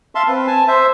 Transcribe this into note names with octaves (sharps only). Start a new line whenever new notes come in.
E5 F5 A5 C6
C4 B4
G#5 A5
C5 E5